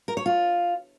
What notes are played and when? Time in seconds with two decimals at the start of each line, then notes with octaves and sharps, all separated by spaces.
0.08 A#4
0.17 C#5
0.26 F4